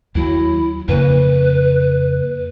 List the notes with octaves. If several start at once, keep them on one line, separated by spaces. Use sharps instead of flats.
D#2 F#3 E4
F2 C#3 A#3 B4